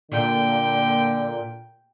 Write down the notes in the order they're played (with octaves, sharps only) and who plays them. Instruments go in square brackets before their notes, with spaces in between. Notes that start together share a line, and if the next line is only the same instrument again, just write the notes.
[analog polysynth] A#2 [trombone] D3 [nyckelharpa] G5